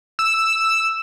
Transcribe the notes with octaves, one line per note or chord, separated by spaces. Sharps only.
E6
E6